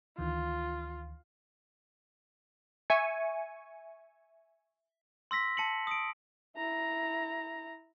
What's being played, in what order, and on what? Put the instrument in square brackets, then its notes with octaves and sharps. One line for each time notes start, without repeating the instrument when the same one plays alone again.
[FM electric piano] D2 D#3 E3 [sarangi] F4
[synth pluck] E5 G#5 C#6 G#6 C#7 D#7
[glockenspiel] C6 E6 A#6 B6
A5 C#7 F#7
D#6 D7
[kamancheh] E4 A#5